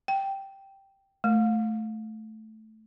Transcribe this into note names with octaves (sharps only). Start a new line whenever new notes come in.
G5
A3